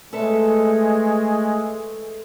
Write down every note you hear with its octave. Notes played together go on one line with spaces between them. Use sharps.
G#3 A3 A4 B4 E5